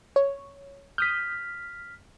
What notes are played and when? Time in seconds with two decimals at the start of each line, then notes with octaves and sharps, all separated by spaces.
0.16 C#5
0.98 D#6 F6 G6 B6